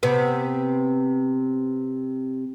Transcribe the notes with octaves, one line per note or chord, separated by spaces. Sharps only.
C3 B3